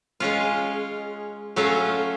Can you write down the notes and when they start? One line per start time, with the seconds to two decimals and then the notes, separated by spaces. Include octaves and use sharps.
0.20 G#3 C#4 F4
1.56 F#3 A3 C#4 F4